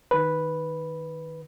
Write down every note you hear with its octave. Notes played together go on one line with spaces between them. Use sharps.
D#3 B4